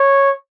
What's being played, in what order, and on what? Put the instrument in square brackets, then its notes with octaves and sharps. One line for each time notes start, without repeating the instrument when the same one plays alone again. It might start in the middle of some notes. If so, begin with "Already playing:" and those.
Already playing: [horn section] C#5